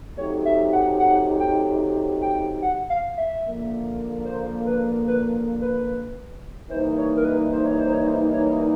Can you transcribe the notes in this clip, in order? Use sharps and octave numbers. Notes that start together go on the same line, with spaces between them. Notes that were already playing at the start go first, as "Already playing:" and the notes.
F#3 A3 C4 D#4 G4 C#5
E5
F#5
F#5
G5
G5
F#5
F5
E5
D3 F3 A#3
C5
B4
B4
B4
E3 G3 A#3 D#4 C5
C#5
A#4
B4
C5
C#5
C5
C#5
C5
C#5